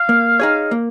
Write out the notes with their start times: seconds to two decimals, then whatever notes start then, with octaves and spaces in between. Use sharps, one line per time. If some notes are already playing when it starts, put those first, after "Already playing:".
Already playing: F5
0.09 A#3
0.40 D#4 G#4 C#5
0.71 A#3